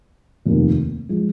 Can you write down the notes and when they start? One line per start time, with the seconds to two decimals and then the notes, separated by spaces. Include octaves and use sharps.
0.46 F1 D#2 D#3
1.09 F3 G#3